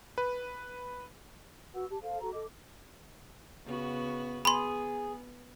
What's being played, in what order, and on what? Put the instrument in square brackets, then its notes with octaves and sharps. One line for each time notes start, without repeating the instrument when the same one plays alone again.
[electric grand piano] B4
[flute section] F#4 B4 F#5 E6
G4 A5
A4 C5 F5
F#4 A4 A#5
A4 D#5 D6
[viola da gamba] C#3 B3 F#4
[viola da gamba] B3 [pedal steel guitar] G#4 [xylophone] B5 C6